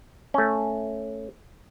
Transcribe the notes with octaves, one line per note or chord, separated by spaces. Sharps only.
A3 C#4